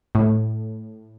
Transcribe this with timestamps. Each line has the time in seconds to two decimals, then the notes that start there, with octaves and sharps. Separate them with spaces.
0.15 A2